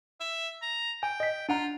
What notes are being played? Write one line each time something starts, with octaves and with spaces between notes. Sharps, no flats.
E5
A#5
G5 G#5
D#5 B6
D4 F4 F#5 A#5